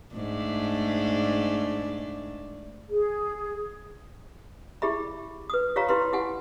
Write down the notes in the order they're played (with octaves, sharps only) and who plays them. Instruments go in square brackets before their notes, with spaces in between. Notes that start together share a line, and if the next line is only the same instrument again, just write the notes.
[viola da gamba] G#2 A3 D4
[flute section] G#4
[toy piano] E4 G4 G#4 E5 B5
B4 D#6
F4 G4 C#5 F5 A#5 B5
E4 G4 B4 B5 C6
E4 G4 F#5 G#5